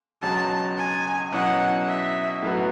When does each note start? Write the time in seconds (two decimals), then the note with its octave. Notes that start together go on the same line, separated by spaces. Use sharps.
0.22 C#2 B2 F#3 C#4 F#4 A5
0.77 G#5
1.32 B2 F#3 C#4 E4 F#5
1.88 E5
2.42 A2 F#3 B3 F#4